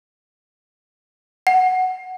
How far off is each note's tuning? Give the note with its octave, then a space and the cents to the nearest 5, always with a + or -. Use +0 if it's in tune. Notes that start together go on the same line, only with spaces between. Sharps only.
F#5 +5